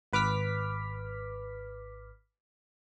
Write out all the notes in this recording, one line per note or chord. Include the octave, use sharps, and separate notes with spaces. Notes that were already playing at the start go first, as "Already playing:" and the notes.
G#1 B4 D6 F6 B6